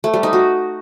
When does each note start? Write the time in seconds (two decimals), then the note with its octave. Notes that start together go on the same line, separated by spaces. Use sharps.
0.04 A3
0.14 G3
0.23 D#4
0.33 F#4